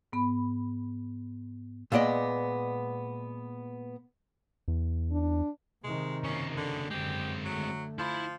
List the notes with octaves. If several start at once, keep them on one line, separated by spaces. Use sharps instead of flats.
G#2 B3 B5
A#2 G#3 B3 D5 D#5
E2
D4
C3 D#3 G#3
C#3 A#3 C#4
D3
F#2 D3 G#3 C4 G4
D3 F#3 A3
F3 E4 B5